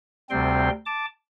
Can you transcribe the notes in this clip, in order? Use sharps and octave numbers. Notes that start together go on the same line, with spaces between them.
D2 C3 G3 C4 G5 C6
A5 D6